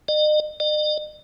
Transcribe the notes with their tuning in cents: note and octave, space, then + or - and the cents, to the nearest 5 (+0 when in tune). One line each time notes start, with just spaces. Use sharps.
D#5 -40
D#5 -45